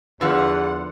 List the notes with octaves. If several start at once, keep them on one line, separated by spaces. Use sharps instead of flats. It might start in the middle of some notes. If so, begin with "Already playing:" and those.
E2 D3 F3 E4 F4 B4 F#5